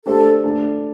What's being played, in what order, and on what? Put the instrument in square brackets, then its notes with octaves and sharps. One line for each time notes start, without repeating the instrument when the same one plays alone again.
[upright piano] A3 D4 G4 C5 [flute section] A4
[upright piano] A3 D4 A4